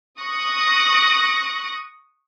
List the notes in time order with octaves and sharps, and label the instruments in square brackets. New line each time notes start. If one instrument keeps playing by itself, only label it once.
[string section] C#6 D#6 F#6 A#6